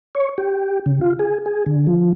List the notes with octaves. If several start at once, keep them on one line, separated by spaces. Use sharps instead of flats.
C#5
G4
C#3
F4
G#4
G#4
D3
F3